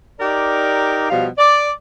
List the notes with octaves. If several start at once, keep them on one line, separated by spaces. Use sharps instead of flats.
D#4 G4 A#4 D5
B2 F3 G3 F#4 F5
D5